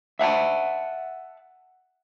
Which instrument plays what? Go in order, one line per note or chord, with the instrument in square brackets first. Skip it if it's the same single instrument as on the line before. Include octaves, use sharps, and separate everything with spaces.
[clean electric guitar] E5 F#5 G#5 A5